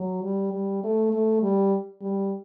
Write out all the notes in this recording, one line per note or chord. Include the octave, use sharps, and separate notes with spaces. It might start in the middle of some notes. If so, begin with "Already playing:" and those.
Already playing: F#3
G3
G3
A3
A3
G3
G3